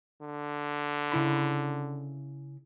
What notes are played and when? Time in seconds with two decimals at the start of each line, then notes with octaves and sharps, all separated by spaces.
0.21 D3
1.12 C#3 E4 B5